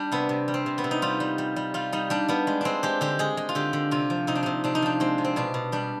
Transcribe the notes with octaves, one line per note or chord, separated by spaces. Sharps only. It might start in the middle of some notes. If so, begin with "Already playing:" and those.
Already playing: G3 D4
C3 B3
C3
G3
C4
C3
B3
C3
D#4
G3 F4
G3
G3
G3
G3 F4
G3 D#4
G3 D4
G3 B3
G#3
G#3 C4 D4
G#3 G4
D3 G4
G#3 G#4
G#3
F4
D3 G4
D3
C3 F4
F3
C3 D#4
D4
C3 D#4
C3 D4
D#4
F3 D4
G#3 C4
C3
C4
B2 D4
B2
G3 D4